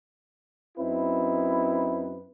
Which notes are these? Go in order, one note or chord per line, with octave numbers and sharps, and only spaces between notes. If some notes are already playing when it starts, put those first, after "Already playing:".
F#2 C4 D#4 E4 B4